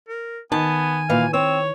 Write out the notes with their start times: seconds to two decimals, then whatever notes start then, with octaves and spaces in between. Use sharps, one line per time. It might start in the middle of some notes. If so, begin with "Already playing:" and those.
0.09 A#4
0.52 D#3 B3 G#5 A5
1.10 A#2 E3 F5
1.34 C4 C#5 E6